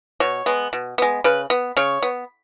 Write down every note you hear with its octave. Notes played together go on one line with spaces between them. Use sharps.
B2 C#5
G#3 B3
B2
G#3 B3
C#3 B4
B3
C#3 C#5
B3